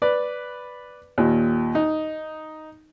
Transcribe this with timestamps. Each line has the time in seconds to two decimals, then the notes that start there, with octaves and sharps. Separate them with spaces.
0.02 B4 D5
1.18 D#2 A#2
1.75 D#4